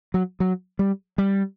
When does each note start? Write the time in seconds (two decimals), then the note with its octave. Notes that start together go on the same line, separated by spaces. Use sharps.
0.14 F#3
0.40 F#3
0.79 G3
1.18 G3